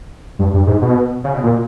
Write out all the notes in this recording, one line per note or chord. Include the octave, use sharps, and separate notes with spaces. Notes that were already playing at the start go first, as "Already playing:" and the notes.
G2
G2
G#2
B2
C#3
B2
A#2